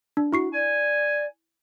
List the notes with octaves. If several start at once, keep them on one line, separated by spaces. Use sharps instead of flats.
D4
E4 F#4 C#6 C7
D5 G#5